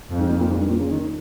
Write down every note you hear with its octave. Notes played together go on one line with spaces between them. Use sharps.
F2
G#2
A#2
A#2
G#2
G2
A#2
C#3
D#3